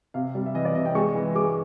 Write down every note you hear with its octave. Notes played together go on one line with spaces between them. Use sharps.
C3 F5
G3
E5
E3 D#5
D5
C3 D#5
G5
G#3 C#6
E3
G#3 D6